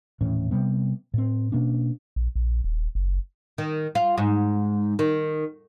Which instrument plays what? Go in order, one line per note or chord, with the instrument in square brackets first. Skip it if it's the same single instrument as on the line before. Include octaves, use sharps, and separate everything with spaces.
[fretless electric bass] D#1 A2 E3 C#4
C3 G3 B3
A2 C4
B2 A#3 C#4 D4
[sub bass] A#1
A#1
D#1
F#1
[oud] D#3
F4
G#2
D#3